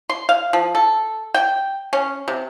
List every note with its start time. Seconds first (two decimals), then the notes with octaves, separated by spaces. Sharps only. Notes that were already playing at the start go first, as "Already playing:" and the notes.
0.10 C6
0.29 F5
0.53 F3
0.75 A4
1.34 G5
1.93 C#4
2.28 C3